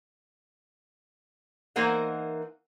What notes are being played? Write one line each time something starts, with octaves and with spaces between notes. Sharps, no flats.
E3 A#3 D#4 A#4 C5 F#5